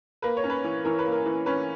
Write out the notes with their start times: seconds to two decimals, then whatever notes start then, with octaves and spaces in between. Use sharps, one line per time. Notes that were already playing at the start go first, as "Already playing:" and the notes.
0.22 A#3 B4
0.37 C#5
0.44 C#4
0.50 B4
0.64 E3
0.84 E3 A#4
0.99 B4
1.06 A#3
1.12 A#4
1.26 E3
1.46 C#4 B4